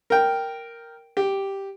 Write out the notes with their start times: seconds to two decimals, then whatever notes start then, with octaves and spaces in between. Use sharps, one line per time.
0.10 A#4 G5
1.17 G4